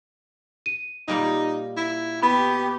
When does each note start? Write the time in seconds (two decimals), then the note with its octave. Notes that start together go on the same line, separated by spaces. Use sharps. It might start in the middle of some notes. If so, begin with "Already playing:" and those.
0.66 D#7
1.08 A#2 G3 A#3 D#4
1.77 E4
2.22 B3 G4 B5